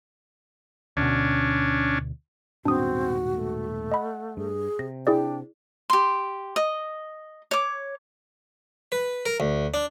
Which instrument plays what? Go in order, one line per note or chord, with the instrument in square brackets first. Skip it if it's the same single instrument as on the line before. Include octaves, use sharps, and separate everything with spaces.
[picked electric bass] D2 B2 [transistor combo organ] C#4 D4
[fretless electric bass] D#1 G#2 B2 [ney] C4 [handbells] D4 D#6 [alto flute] F#4
[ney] A3
[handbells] D#5 B5 [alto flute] F#5
[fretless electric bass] G2 [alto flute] G#4
[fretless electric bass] C3 [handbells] A#6
[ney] D4 [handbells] E4 G#4 D5 [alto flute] G5
[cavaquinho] G4 C6
D#5
C#5 D6
[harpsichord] B4
A#4
D2
D4